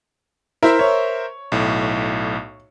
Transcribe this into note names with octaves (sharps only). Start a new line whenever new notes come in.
E4 A#4 C5 E5
C#5
B1 A2